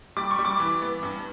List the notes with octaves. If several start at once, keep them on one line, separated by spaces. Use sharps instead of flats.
G3 D6
C#6
G3
D6
E3
B3
G2